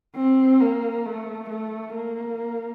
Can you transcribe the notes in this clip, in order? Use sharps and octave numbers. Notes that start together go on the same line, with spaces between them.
C4
A#3
A3
A3
A#3